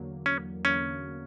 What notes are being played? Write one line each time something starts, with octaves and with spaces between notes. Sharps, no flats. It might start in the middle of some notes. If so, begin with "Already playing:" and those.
Already playing: E2 D3 F#3 A#3
C#4
E2 D3 F#3 A#3 C#4